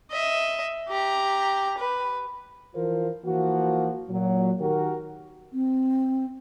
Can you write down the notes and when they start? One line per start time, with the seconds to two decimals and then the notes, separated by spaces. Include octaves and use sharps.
0.11 D#5 E5
0.89 G4 A#5
1.78 B4
2.75 E3 F3 F4 A#4 C5
3.24 E3 F3 A#3 F#4
4.09 A#2 F#3
4.60 D#3 F#4 G4 A#4
5.53 C4